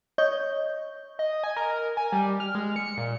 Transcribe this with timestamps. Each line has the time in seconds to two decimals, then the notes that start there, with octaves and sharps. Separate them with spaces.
0.18 C#5 D#5 G6
1.19 D#5
1.44 G#5
1.57 A#4
1.97 G#5
2.13 G3
2.40 F6
2.55 G#3
2.76 C#7
2.98 A#2